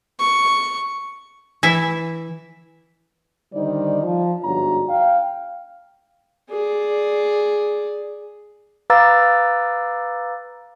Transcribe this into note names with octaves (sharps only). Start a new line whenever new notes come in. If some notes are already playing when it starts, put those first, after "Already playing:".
C#6
E3 E4 E5
D3 D#3 G3 D#4 C5 D5
F3
G1 G#2 D4 F#4 C#5 A#5
F5 G5
G#4 D5
B4 F5 A#5 D6 E6 A6